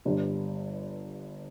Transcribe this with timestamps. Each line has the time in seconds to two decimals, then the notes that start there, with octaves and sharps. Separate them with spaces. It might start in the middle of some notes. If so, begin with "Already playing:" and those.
0.05 G1 G2 G3 D4